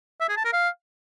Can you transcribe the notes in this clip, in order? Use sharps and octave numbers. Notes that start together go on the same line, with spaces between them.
E5
G#4
A5
A#4
F5